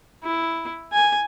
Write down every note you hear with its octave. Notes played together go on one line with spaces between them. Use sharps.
E4
G#5